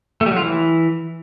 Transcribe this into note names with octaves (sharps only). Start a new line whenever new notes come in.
A3
G3
F#3
F4
E3